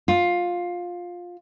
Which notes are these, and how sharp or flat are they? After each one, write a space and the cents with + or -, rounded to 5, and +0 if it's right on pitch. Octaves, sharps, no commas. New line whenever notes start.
F4 +15